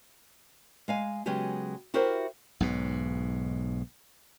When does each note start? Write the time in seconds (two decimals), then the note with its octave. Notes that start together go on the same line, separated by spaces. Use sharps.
0.88 G#3 F5 G#5
1.26 C#3 F#3 G#3 B3 G4 G#5
1.94 E4 F#4 G4 A#4 C5
2.60 B1 G#2 B2